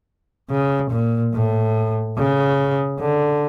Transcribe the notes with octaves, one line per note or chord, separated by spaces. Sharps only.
C#3
A#2
A2
C#3
D3